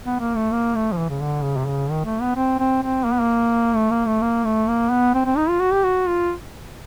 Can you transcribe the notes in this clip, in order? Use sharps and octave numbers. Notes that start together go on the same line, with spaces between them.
B3
A#3
A3
A#3
A3
F3
E3
C#3
D3
C#3
C3
C#3
D#3
A3
B3
C4
C4
C4
A#3
B3
A#3
A3
A#3
A3
A#3
A3
A#3
B3
C4
C4
D#4
F4
F#4
G4
F#4
F4